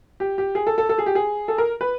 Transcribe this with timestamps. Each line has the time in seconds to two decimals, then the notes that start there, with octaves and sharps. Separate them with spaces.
0.20 G4
0.38 G4
0.55 G#4
0.67 A4
0.78 A4
0.89 A4
0.98 G#4
1.06 G4
1.15 G#4
1.48 A4
1.58 A#4
1.81 B4